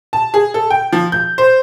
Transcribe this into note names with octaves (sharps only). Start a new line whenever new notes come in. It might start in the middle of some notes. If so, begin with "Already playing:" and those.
A5
G#4
A4
G5
F3
G6
C5